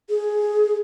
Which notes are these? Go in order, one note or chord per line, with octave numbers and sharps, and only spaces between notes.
G#4